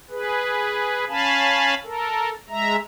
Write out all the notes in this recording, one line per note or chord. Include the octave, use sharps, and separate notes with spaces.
G#4 B4
C#4 F5 G#5 A5 B5
A4 A#4
G#3 E5 A#5